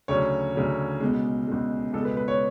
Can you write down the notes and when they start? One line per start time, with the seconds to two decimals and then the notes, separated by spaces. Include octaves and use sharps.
0.08 D2 C#3 F#3 C#5
0.55 D2 C#3 F#3
1.01 C#2 B2 G#3
1.47 C#2 B2 G#3
1.93 C#2 B2 G#3 A4
2.05 B4
2.17 B4
2.28 C#5